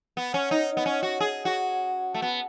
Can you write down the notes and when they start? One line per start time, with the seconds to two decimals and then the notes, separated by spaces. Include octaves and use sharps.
0.17 B3
0.34 C#4
0.51 D#4
0.77 B3
0.86 C#4
1.03 F#4
1.20 G#4
1.45 F#4
2.14 A3
2.22 B3